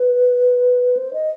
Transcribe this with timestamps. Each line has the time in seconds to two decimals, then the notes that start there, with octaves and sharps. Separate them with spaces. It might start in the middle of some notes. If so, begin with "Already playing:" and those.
Already playing: B4
0.97 C5
1.13 D#5